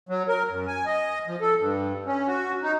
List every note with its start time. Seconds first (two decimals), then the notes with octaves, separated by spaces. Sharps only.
0.09 F#3
0.28 A#4
0.49 F#2
0.67 G#5
0.86 D#5
1.28 F3
1.41 A4
1.60 G2
2.06 C#4
2.27 F#4
2.63 D#4